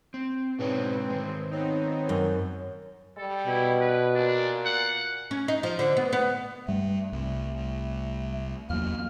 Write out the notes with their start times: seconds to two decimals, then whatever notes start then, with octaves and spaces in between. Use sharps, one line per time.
0.14 C4
0.59 G#2 B2 C4 D4 B4 C#5
1.10 D#3 G#3
1.51 B3 C4 D#4 C#5
2.09 F#2
3.17 G3 A4
3.47 B2 E4
3.81 B4
4.15 A#2 D4
4.65 F#5
5.31 C#4
5.48 D#4
5.63 F3
5.79 D3
5.97 B3
6.13 B3
6.68 G2 G3 A3
7.12 C2
8.70 E2 F#3 A#3 F6